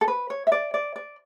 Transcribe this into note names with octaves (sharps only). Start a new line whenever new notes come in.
A4
B4
C#5
E5
D5
D5
D5